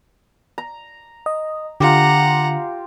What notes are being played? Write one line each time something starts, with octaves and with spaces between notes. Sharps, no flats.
A#5
D#5
D3 F4 G4 F#5 A#5